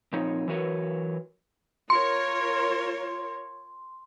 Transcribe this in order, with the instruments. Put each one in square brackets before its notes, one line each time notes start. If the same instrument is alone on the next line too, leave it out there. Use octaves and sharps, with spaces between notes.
[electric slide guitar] A#2 F3 C4 D#4 C#5
E3 F#3 F#4 A#4 B4 C#5
[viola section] F4 A#4 C#5 [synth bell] C6